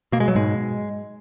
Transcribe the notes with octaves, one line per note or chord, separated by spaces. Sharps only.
B2 A#3
G#3
F#3
G#2 G#3